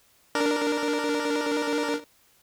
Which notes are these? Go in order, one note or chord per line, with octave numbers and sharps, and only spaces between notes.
D4 A#4